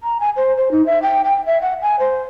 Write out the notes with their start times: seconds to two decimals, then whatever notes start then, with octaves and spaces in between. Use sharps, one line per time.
0.03 A#5
0.20 G#5
0.36 C5
0.57 C5
0.71 D#4
0.86 E5
1.02 G5
1.24 G5
1.46 E5
1.62 F#5
1.82 G#5
1.99 C5